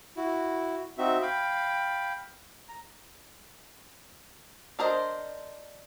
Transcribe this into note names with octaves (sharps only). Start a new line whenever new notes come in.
E4 F#4
C4 D#4 F#4 E5
F5 G5 B5
A#5
D4 A#4 C5 D#5